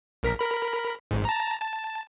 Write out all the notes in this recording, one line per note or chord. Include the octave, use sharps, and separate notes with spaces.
A#1 A#4 B6
A#4 B5
G#1 G#2
A5 A#5
A5